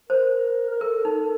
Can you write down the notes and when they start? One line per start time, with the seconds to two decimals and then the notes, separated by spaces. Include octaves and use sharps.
0.09 A#4 C5
0.70 A#4
0.81 A4 A#4
1.05 D#4